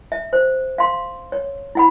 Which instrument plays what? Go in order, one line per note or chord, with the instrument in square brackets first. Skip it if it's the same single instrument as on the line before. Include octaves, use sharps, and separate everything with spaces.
[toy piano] E5
C5
F5 C6
C#5
E4 F#5 B5